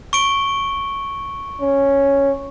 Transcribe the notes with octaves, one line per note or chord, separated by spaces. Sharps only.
C#6 D7 G7
C#4